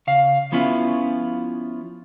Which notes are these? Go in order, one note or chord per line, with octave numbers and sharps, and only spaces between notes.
C#3 F5
F3 B3 C#4 E4 F4